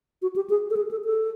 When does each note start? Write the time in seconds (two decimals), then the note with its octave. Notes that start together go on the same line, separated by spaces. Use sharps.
0.22 F#4
0.36 G4
0.50 G#4
0.70 A4
0.77 G#4
0.91 A4
1.05 A4